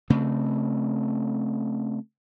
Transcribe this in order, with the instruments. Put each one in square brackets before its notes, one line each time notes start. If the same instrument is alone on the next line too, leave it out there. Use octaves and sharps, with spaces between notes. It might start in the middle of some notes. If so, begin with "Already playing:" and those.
[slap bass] C#3 A3 C4